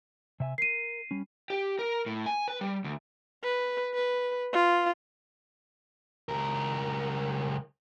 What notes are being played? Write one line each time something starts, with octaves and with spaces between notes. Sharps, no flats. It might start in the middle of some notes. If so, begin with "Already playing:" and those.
C3 E5 G#5
A#4 C7 D#7
G3 C#4
G4
A#4
A2
G#5
B4
G3
D2
B4
B4
F4
C#2 A#4